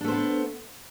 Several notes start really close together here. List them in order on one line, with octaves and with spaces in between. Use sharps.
D4 A3 C5 B3